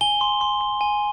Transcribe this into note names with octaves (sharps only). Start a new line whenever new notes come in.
G#5 G7
C6
C6
C6
G#5